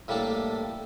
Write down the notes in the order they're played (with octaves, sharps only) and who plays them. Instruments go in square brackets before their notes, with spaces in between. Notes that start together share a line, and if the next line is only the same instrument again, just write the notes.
[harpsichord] A2 G3 A#3 D4 A4